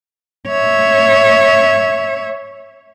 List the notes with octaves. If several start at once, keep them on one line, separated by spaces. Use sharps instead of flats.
C#5 E5